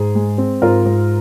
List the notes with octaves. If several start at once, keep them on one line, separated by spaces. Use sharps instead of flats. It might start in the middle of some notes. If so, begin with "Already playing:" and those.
Already playing: G#2 G#4
G#3
C4
G#2 F4 A#4
G#2